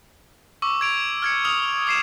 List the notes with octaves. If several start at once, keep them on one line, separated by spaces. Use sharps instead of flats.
C#6 D6 E6
G#6 D7 F7
F6 G#6 C#7
D#6 F6 F7 F#7
D6 D#6 C7 D#7 E7